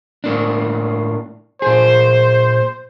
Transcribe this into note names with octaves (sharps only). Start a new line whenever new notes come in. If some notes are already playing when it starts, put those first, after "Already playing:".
A2 A#3 D4
A#2 G#4 C5